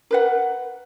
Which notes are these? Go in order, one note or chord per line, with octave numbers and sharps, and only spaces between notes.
A#4 B4 F#5